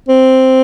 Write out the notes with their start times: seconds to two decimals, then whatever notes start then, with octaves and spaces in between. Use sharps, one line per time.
0.09 C4